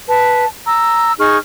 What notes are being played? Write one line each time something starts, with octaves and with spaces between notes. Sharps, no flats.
B4 A5
A#5 E6
D#4 G#4 C#6 F6